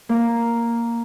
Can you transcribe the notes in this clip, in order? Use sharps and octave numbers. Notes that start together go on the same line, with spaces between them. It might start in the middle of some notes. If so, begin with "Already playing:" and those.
A#3